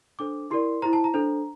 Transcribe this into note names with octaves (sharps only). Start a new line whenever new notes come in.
D4 A4 C5 D6
E4 G4 A#4 D5 C6
E4 G4 C5 A#5
A5
A#5
D4 A4 C5